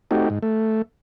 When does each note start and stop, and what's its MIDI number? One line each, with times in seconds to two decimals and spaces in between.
0.11 0.29 57
0.11 0.29 60
0.11 0.29 63
0.11 0.29 66
0.11 0.29 67
0.30 0.39 44
0.43 0.82 57